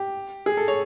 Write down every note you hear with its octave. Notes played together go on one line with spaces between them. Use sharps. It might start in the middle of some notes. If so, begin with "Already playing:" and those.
Already playing: G4
G#4
A4
C#5